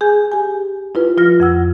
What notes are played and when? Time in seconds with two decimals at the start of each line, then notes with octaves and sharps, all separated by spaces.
0.01 G#4 G#5 G6
0.32 G4 G#5
0.95 E4 F4 B4
1.17 F3 F4 F6 A#6
1.40 F2 F#5 E6